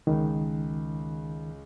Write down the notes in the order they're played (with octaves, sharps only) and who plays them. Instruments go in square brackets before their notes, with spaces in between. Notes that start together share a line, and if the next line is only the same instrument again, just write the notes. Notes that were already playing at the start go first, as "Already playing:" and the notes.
[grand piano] C#2 [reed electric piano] D#3